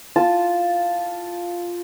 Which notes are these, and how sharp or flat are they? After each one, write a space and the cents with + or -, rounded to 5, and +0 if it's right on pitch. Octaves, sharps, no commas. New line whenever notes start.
F4 +0 A5 +0